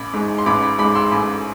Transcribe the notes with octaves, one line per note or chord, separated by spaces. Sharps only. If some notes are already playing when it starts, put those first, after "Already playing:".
Already playing: A1 B5 D6
G#2 G#3
C6
A1 B5 D6
B5 D6
G#2 G#3 B5 D6
C6 E6
A1 B5 D6